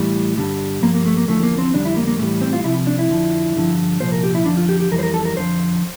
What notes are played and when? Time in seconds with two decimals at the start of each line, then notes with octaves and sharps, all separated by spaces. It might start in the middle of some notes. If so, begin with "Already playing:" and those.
Already playing: A2 E3 G3
0.37 G2 D3 G3
0.82 G2 F3 A#3
0.95 A#3
1.06 A3
1.17 A#3
1.28 E2 D3 F3 A3
1.43 A#3
1.58 C4
1.74 F2 D3 G3 D4
1.85 E4
1.97 A#3
2.07 A#3
2.19 A2 E3 G3 A3
2.41 C4
2.53 F4
2.64 C2 C3 F3 E4
2.87 D4
2.99 E4
3.10 F2 D3 F3
3.55 G2 D3 F3
4.00 C2 A#2 F3 C5
4.12 A#4
4.24 G4
4.35 E4
4.46 F2 D3 F3 D4
4.57 F4
4.69 G4
4.80 G4
4.91 F2 E3 G3 A#4
4.99 C5
5.03 A#4
5.14 A4
5.25 A#4
5.37 F2 D3 F3 C5